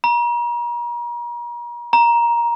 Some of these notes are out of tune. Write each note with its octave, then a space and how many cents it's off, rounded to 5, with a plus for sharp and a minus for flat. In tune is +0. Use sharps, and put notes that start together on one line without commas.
A#5 +40
A#5 +15